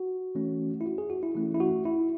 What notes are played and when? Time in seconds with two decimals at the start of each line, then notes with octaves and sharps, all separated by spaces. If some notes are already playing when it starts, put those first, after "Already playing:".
Already playing: F#4
0.35 E3 A3 C#4
0.81 E4
0.86 F#4
0.98 G#4
1.10 F#4
1.23 E4
1.35 E3 A3 C#4 E4
1.54 E4
1.60 F#4
1.85 E4